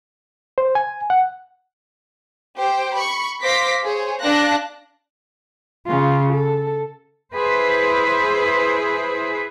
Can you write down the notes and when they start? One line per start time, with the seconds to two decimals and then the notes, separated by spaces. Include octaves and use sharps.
0.58 C5
0.75 G#5
1.10 F#5
2.56 G4 C5 G5
2.95 B5 C#6
3.42 C5 F5 C6 D6 A#6 B6
3.84 G#4 C5 C#5
4.20 D4 F5 A5 F#6 A#6
5.86 C#3 F4
6.33 A4
7.35 E4 G#4 B4 C5